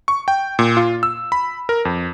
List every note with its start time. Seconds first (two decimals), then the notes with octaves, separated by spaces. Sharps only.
0.08 C#6
0.28 G5
0.59 A#2
0.77 F4
1.03 E6
1.32 B5
1.69 A#4
1.85 F2